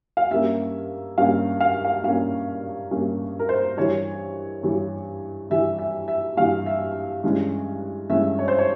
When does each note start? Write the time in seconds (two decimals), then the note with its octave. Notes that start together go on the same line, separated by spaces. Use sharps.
0.17 F5
0.31 G2 G3 A#3 C#4 E5
1.18 G2 G3 A#3 C#4 F5
1.60 F5
1.85 F5
2.03 G2 G3 A#3 C#4 F5
2.91 G2 G3 A#3 C#4
3.39 A#4
3.49 C5
3.77 G2 E3 G3 C#5
4.63 G2 E3 G3
5.50 G2 E3 G3 E5
5.79 E5
6.08 E5
6.37 G2 E3 G3 F5
6.66 E5
7.23 G2 E3 G#3 C#4
8.10 G2 E3 G#3 C#4 E5
8.39 C#5
8.48 C5
8.59 C#5